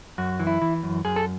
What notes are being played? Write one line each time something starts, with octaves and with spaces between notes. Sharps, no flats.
F#2 F#4
E3
E4
E3
F#2
F#2 G#4
A4